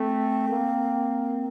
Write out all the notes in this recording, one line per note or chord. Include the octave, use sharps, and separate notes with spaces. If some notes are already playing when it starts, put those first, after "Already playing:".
Already playing: A3 C4
A#3